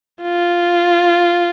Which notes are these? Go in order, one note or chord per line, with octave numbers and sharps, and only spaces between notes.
F4